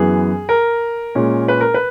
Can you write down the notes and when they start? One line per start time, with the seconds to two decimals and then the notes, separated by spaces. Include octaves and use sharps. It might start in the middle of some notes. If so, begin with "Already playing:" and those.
Already playing: F#2 E3 B3 G#4
0.49 A#4
1.15 A#2 G#3 C#4
1.48 B4
1.61 A#4
1.74 B4